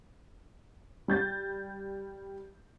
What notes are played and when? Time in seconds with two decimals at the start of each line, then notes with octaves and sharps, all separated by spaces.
1.08 G3 G6 A6